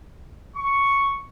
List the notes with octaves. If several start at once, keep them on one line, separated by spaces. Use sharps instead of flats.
C#6